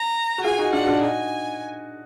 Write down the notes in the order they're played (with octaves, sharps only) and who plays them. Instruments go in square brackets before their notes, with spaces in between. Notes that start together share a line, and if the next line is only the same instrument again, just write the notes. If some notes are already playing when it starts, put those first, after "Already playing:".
Already playing: [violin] A#5
[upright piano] F#4
[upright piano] F4 G#4 [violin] G#5
[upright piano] D#4 F#4
[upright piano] D4 F4 [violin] F#5
[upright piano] F#4
D4 F4
[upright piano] D#4 F#4 [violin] G#5